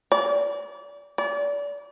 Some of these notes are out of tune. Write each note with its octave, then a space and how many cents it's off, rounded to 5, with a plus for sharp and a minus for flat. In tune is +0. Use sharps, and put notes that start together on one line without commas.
D5 -35
D5 -35